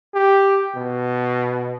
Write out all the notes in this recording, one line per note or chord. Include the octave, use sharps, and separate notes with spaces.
G4
B2